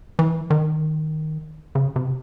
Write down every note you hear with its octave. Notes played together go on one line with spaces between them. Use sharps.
E3
D#3
C#3
C3